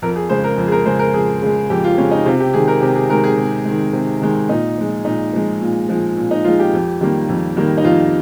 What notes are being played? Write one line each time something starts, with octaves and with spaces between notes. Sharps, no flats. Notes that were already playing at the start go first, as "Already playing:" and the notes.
F2 A#4
G#4
C#3 G#3 C5
A#4
F2
G#4
A#4
C#3 G#3 C5
A#4
F2 G#4
C#3 G#3
F2 G4
F4
C#3 G#3 C#4
D#4
C3 F4
G4
D#3 G#3 G#4
A#4
C3 G4
G#4
D#3 G#3 A#4
G#4
C3
D#3 G#3
C3
D#3 G#3
A#2 D#4
F3 G#3
A#2 D#4
F3 G#3
A#2
F3 G#3
A#2
D#4
F3 G#3 F4
G4
F2
D#3 G3 A#3
F2
D#3 G3 A#3
D#4
F2 F4